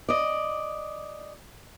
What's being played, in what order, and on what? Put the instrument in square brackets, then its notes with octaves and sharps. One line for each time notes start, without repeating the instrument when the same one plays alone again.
[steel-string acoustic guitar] D5 D#5